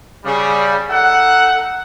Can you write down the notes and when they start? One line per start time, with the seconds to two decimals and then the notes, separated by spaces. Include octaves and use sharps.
0.25 C#3 G3
0.90 D#4 A4 E5 F#5